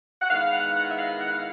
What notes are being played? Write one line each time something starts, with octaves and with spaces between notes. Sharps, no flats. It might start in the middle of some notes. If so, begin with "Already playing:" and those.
F#5
D#3 G#3 B3 E4 F5
F#5
F#5
E5
F5
F#5
F5